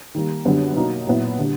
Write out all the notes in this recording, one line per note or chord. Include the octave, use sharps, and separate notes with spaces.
D#3 G3 A#3
F#2 D3 G3 B3
B2 F#3 A#3 D#4
A#2 F#3 B3 E4
D3 G3